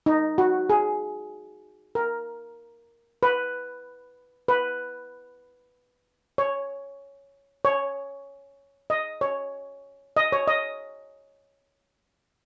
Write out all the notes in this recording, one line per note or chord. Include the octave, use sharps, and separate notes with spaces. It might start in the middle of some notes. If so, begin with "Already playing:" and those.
D#4
F#4
G#4
A#4
B4
B4
C#5
C#5
D#5
C#5
D#5
C#5
D#5